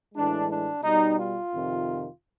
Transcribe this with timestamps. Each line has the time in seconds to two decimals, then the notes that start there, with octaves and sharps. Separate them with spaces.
0.14 A2 E3 G#3 D4
0.49 D4
0.83 B2 G3 D#4
1.17 F4
1.51 F2 C3 D#3